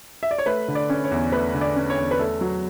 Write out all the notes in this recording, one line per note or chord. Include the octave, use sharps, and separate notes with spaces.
E5
D5
C#5
A3 B4
D3
D5
C#4
C#5
E2
A3 B4
D3
D5
C#4
C#5
E2
B4
A3 A4
F#3